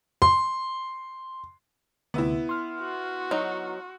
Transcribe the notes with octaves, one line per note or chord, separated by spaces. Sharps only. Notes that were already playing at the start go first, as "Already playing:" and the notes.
C6
D2 C3 B3 E4 E5
C6 F6
F#4
F#3 D#4